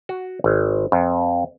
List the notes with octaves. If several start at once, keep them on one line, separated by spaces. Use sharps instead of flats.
F#4
G#1
F2